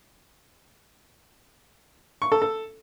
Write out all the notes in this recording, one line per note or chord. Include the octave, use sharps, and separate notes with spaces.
C#6
A4
A4